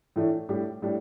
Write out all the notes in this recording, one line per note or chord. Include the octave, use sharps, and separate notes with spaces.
A2 E3 A3 D4
A2 G3 D4 G4
A2 G3 D4